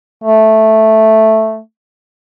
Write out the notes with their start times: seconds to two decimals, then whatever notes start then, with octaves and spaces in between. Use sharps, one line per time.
0.24 A3